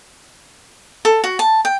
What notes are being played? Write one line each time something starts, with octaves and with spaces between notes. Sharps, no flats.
A4
F#4
A5
G5